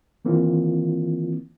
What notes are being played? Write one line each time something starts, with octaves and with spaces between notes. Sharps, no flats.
D#3 E3 A#3 C4 E4 F4